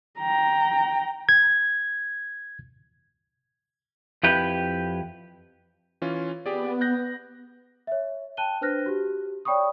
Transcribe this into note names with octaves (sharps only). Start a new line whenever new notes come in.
G5 A#5
G#6
F2 E4 G4 B4
E3 C#4 F4
B3 G4 G#4 D5
F#6 G6 A#6
C#5 E5
G5 A5 F#6 D#7 G7
D4 B4 C5 F6 F#6 A#6
F#4 G4
C#5 D5 G5 B5 C#6 D#6